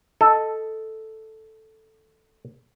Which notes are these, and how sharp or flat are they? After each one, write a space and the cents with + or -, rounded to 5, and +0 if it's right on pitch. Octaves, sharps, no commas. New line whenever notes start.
A4 +0 D#5 +5